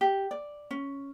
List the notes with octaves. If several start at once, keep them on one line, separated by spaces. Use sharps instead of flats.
G4
D5
C#4